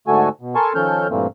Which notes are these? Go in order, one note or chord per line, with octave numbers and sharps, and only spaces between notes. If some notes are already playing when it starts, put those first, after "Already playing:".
G#2 D3 A3 F#4 A4 G#5
B2
A4 A#4 G#5 A5 C6 C#6
D#3 F3 C#4 A4 F6 G6
G2 A#2 E3 A3 A#3 C4